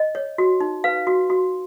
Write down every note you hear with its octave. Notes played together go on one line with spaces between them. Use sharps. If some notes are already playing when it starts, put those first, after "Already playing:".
Already playing: D#5
C#5
F#4
D#4
B4 F5
F#4
F#4